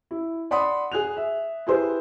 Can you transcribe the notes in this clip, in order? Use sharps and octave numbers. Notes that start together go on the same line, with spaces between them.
E4
D5 F#5 B5 C6 D#6
G#4 F#6 F7
E5
E4 G4 G#4 B4 C5